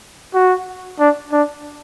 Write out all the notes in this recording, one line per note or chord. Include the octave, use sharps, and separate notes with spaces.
F#4
D4
D4